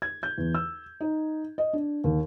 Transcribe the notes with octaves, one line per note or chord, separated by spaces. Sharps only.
G#6
G6
E2
E6
D#4
D#5
D4
D#2